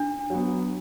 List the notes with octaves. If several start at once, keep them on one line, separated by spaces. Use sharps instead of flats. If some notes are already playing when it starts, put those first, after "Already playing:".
Already playing: D4
F#3 B3